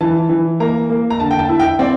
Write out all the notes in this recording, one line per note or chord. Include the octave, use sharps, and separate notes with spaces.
E3 A5
E3
A#3 A#5
A#3
A#5
D3 A5
G5
A5
E4
G5
C4 D5